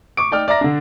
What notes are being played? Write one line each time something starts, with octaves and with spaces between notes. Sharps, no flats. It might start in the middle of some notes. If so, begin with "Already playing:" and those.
C#6 D6 D7
D#4 D5 G5 D6 F6
D5 E5 A#5 A#6
D3 D4